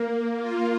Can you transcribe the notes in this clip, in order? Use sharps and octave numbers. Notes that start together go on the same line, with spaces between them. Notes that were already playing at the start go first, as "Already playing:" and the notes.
Already playing: A#3
F4